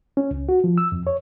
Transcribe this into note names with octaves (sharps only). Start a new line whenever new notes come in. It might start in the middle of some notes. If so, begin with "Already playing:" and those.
C#4
C#2
F#4
F3
E6
F2
C#5